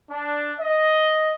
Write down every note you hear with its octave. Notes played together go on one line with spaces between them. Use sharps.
D4
D#5